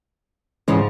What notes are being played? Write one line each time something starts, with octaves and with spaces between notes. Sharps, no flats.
G#2 C#3 E3 F3 G#3 C#4